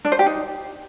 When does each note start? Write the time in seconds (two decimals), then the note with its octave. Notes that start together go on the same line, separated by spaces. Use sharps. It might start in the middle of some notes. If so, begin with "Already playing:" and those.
0.05 D4
0.12 C5
0.19 G4
0.26 D#4